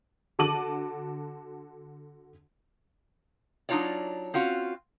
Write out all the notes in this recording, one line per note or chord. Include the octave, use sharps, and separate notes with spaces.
D3 F#4 A5 D6 D#7 F#7
F#3 D4 D#4 F4 C#5 D5
C4 C#4 F4 F#4